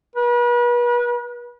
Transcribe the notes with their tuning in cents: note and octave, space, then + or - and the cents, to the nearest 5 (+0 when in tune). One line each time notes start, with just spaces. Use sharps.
B4 -40